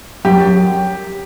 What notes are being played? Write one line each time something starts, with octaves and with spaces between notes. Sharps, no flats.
F#2 G4
F#2